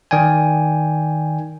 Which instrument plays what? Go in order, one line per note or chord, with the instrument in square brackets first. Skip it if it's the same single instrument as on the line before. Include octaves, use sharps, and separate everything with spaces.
[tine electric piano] D#3 D5 G5 G#5